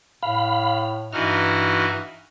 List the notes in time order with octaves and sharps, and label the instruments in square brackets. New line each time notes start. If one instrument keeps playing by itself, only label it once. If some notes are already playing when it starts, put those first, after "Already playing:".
[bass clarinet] A2 [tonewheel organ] F5 B5
[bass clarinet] G2 [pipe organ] E3 D#4 F#4 [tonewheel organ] F6